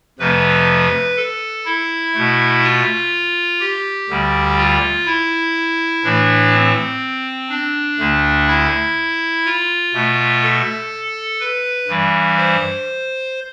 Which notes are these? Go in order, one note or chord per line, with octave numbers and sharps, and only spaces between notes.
F2 C3 F3 A3 B4
A4
E4
B2 A3
F4
G4
D2 D3 G3
F4
E4
A2 E3 A3 D4
C4
D4
D2 D3 A3
E4
F4
B2 A3
A4
B4
G2 E3 G3
C5